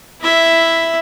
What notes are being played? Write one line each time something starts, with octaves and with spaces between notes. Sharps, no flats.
E4 E5